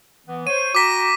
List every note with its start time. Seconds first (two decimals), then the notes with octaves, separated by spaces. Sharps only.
0.27 E3 B3
0.47 C5 C#5 D#7
0.75 F#4 G5 A#5 D6 B6